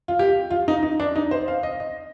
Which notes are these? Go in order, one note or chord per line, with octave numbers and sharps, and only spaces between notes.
F4
G4
F4
D#4
D#4
D4
D#4
C5
F5
D#5
D#5